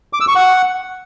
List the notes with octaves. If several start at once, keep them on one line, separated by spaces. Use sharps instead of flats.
D6
E6
C#6
F#5